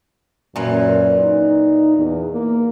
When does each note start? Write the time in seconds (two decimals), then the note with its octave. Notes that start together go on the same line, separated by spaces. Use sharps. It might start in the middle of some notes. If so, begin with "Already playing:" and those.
0.56 F#2 A#2 E3
1.20 D#4
1.97 E2
2.33 A#3